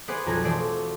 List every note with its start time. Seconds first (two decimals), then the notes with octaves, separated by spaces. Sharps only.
0.08 B3 G#4 B4 C5 D5 F#5
0.26 B1 F2 A#5 G#6
0.44 E1 A3 C5 D5